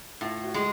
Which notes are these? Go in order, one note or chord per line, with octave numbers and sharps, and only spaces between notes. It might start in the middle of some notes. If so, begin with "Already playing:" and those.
A2 F4
F#4
G#3